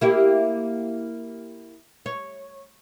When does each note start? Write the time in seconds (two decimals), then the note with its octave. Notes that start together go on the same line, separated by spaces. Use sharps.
0.01 A#3 E4 G4
2.06 C#5